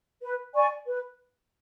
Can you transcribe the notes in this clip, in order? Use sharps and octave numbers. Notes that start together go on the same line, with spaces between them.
B4
D5 G#5 C#6
B4